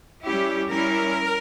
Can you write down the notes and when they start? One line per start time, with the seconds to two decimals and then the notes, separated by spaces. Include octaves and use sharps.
0.23 G3 C#4 E4 G4
0.69 G3 C#4 E4 A#4